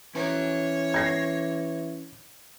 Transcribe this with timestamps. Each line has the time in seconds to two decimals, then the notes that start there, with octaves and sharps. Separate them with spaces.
0.15 E3 C#4 C#5 A#5
0.94 G#6 A#6 C7